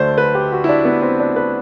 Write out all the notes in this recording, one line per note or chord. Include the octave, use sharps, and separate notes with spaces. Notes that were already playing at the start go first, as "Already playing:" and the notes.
Already playing: D2 D3 A3 C5 D5
B4
G4
F#4
E4
D4
B3
C4
D4
B4